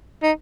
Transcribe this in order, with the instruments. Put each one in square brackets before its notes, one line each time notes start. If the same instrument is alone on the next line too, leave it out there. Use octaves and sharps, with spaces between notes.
[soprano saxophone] D#4